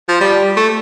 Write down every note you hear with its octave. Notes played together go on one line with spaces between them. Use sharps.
F3
G3
A3